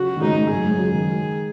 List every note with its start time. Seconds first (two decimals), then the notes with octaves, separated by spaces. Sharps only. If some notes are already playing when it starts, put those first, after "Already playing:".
Already playing: C#3 F#3 F#4
0.16 D#3
0.21 G#2 C#3 D#4
0.37 G#2
0.50 F#2 G#4
0.64 G#2
0.78 C#3 F#3
0.92 D#3 G#3